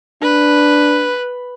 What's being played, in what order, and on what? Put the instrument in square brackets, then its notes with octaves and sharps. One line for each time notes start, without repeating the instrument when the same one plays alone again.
[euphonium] D4 [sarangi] B4